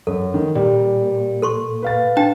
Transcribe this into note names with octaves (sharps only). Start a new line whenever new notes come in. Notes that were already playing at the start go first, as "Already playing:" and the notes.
F#2 A4
D#3
A#2 G3
A4 C6 C#6
B4 F5 A6
D4 G5 A5